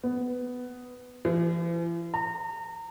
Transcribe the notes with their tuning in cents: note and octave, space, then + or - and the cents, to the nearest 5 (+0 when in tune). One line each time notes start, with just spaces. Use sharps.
B3 +10
E3 +45
A#5 -30